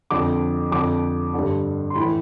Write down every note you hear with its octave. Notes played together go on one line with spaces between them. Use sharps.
F2 D3 D6
F2 D3 D6
G2 D3
C6
A2 E3 B5